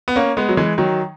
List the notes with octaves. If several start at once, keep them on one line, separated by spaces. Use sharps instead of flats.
B3
A#3 C#4
G#3 B3
F#3
E3 G#3
D#3 F#3